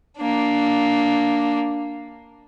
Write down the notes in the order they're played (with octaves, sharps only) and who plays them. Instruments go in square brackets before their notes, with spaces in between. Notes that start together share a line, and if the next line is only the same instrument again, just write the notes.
[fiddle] A#3 D4